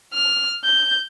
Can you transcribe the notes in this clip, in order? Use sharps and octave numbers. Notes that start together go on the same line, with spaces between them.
F6
G6